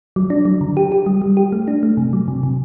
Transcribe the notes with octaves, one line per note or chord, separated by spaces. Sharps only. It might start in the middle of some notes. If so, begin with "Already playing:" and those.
F#3
D4
F#3
D3
G4
G4
G3
G3
G4
A3
D4
A3
C3
F#3
C3
C3